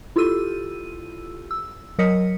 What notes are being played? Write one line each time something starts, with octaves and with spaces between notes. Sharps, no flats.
E4 F4 G4 A4 E6 D#7
E6
F#3 A#4 D#5 D#6 B6 C#7